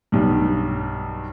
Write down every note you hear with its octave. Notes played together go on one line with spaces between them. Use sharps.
B1 G2